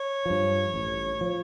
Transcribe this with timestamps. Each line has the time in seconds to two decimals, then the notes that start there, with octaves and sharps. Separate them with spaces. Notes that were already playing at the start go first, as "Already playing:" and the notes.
Already playing: C#5
0.26 G2 F3
0.74 A1
1.21 F3